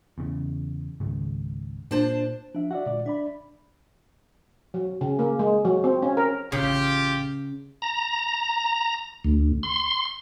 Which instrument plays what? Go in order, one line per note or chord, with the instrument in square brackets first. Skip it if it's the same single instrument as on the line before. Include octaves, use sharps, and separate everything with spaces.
[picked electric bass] E2 C#3
G#1 C#2 C#3
[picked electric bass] A#2 [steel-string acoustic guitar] D4 C5 A5
[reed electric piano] F3 E5 [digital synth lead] D4
[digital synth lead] F#4 [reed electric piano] D5 E5 F#5
[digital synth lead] A#2 [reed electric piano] D3 G#3 D5
[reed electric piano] D4 D5 B5 [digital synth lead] E5
[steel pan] F#3
C#3
A#3
G#3
F#3
C4
C#4
A#4
[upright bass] A1 [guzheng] C#3 [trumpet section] F4 G4
[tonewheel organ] A#5
D2
C6